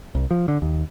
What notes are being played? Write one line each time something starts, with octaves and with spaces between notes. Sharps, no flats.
C2
F3
D3
D#2